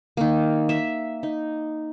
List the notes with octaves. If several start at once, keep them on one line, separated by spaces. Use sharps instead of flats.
D#3 A#3
E5
D#4